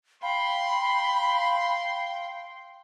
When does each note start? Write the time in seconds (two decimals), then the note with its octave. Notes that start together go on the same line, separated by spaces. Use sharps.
0.22 F5 G5 B5 C6